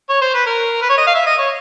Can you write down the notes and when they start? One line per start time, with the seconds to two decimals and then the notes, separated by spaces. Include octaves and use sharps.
0.09 C#5
0.21 C5
0.34 B4
0.46 A#4
0.82 B4
0.89 C#5
0.98 D#5
1.07 F5
1.15 E5
1.26 D#5
1.38 C#5